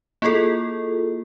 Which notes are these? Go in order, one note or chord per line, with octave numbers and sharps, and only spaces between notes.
A#3 E4 F4 G#4 A4